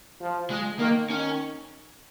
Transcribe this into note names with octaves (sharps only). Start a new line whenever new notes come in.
F3
G#3
D#3 A#3
D#3 C#4